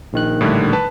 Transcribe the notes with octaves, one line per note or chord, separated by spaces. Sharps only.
A#1 D#3 F#6
A2 D3 G3
B4 A5